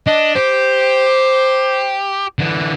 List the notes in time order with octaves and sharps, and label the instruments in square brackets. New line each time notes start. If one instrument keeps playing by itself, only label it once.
[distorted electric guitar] D4 [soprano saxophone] D#5
[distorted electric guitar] G4 [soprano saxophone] C5
[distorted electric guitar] D3 E3